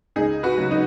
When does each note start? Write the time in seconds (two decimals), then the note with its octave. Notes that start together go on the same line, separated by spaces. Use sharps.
0.16 C#2 D#4 G#4
0.43 F#4 B4
0.57 C#3 F#3
0.71 D#4